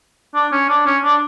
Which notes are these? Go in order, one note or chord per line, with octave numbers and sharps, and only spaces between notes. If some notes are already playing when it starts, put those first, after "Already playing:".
D4
C#4
D4
C#4
D4